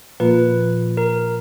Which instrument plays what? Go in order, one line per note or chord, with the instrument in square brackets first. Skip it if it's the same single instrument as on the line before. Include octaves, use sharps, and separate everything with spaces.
[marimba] A#2 F3 A#3 F4 [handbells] B4
[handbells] A#4